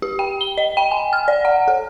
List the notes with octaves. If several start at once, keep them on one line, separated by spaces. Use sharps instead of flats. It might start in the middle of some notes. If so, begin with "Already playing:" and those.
G4
G5
G7
D#5
G5
G#5
F6
D5
F#5
A4